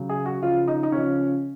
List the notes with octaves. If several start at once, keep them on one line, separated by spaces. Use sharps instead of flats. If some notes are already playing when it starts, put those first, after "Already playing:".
Already playing: C#3 F#3
G#4
F#4
C#3 F3 F4
D#4
D#4
C#3 F3 C#4